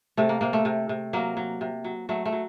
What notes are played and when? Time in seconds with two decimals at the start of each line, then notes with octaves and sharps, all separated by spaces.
0.17 C3 A3
0.29 A#3
0.41 C3 A#3
0.53 A3
0.65 C3
0.89 C3
1.13 F#3 A#3
1.37 F#3
1.61 C3
1.84 F#3
2.09 F#3 A3
2.26 A3
2.32 F#3